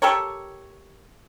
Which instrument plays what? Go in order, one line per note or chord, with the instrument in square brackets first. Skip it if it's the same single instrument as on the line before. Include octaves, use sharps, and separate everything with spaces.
[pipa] G4 A4 A#4 C#5